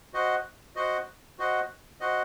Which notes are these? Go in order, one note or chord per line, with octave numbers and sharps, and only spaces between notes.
F#4 C5 D#5 F#5
F#4 C5 D#5 F#5
F#4 C5 D#5 F#5
F#4 C5 D#5 F#5